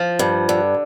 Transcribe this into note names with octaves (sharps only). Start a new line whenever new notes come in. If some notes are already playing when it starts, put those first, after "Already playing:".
Already playing: F3
G2
D3